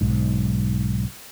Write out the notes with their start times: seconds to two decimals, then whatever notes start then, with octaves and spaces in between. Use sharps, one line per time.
0.01 B1 G#2